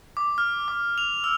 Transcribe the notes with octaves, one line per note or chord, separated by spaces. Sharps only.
D6
F6
D6
F7
E6